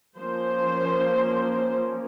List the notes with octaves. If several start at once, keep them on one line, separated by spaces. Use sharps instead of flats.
F3 A#3 C#4 C5